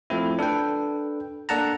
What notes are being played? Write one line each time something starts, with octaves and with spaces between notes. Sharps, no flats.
F3 A3 C4 E4
D4 A4 B4 G5
A#3 D4 A4 F#5 A5 A#5